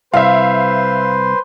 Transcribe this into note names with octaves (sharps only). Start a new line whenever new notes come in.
C2 B4 C5 E5 F5 C6